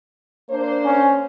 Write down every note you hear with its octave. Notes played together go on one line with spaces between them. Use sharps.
A#3 D4 C5
C#4